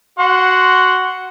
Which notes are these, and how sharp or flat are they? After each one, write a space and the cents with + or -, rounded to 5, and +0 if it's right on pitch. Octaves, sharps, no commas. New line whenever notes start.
F#4 +10 F#5 +0 C6 +0